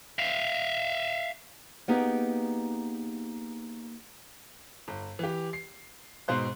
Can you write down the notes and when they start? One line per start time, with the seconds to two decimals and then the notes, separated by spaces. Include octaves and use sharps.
0.19 E5 F5
1.88 A#3 B3 D#4 G4 G#4
4.88 G1
5.19 E3 G4
5.53 C7
6.28 G#2 B2 C5 F#6